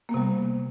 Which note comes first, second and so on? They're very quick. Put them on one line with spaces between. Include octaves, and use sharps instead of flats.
A#3 B3 C3 G3